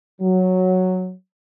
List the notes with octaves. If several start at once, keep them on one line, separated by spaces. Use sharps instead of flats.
F#3